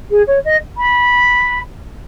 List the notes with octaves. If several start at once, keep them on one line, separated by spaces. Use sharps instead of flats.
G#4
C#5
D#5
B5